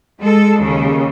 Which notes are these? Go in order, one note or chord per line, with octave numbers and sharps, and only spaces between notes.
G#3 A4
D#2 C#3